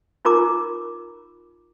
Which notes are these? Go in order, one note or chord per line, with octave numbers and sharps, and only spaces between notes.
D#4 F4 A#4 A#5 D6